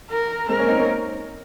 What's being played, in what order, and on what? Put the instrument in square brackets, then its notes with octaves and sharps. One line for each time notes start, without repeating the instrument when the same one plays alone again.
[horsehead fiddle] A#4
[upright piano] G#3 C4 [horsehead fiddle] A#4
[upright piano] A#3 C#4
C4 D#4
A#3 C#4